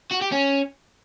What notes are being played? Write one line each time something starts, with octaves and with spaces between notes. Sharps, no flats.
F#4
G4
C#4